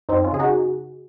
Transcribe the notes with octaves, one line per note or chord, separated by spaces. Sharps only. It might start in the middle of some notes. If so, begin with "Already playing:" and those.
F#2 C4 D#4
C#4 F4
C#3 G#4
D#4 F#4